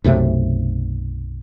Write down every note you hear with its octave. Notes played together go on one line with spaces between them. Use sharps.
B1 F#2 C3 A3